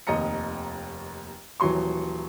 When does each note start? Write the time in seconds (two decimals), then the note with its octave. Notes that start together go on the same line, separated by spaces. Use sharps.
0.07 F1 D#2 D#5 A#5 C#7
1.60 D#1 E3 F#3 C6 C#6